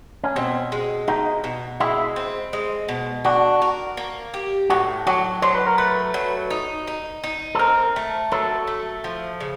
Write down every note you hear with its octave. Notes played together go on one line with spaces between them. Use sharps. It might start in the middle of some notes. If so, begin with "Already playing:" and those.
C#4
B2 C4
G#3
B2 D#4
B2
G#3 E4
C4
G#3
B2
D4 F#4
A#4
A#3
G4
A2 F#4
F#3 F#4
F#3 C5
B4
A#4
A3 B4
F#3
D#4
D#4
D#4
A4
C4 A#4
A3
F#3 A4
A3
F3
C#3